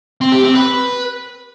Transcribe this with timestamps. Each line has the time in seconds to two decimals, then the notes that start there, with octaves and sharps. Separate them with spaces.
0.21 C4
0.32 G4
0.44 C4
0.55 B4